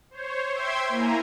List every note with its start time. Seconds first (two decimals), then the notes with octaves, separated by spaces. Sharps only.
0.11 C5 C#5
0.54 C5 E5 G5 C6 G#6
0.89 A#3 E4 G#5 A#5